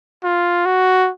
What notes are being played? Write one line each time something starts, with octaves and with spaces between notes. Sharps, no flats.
F4
F#4